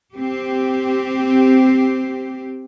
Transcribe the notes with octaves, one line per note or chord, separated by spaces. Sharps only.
C4 G4